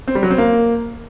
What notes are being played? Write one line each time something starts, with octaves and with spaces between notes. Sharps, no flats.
C4
G3
F#3
C4
A#3